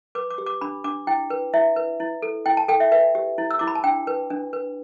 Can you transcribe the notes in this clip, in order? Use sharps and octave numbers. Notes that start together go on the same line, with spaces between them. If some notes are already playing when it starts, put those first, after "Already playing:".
B4 D6
D6
G4
D6
D4 B5
D4 D6
E4 G5
B4
E4 E5
B4
E4
A4
E4 G5
A5
A4 G5
E5
B4 E5
G4
E4
E6
E4 D6
B5
A5
D4 G5
B4
D4
B4